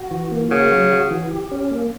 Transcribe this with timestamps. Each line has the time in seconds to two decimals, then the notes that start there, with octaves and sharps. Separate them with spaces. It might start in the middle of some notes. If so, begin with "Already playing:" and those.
Already playing: F#4
0.11 E3
0.31 A#3
0.51 C#3 F#4
0.71 F#3
0.91 F#4
1.11 E3
1.31 G4
1.52 C#4
1.71 A#3